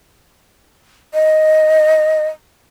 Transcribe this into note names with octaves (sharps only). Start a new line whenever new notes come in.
D#5